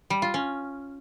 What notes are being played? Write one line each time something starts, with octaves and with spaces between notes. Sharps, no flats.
G3
F4
C#4